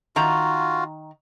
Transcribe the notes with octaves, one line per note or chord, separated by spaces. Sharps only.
D#3 F4 F#4 A#5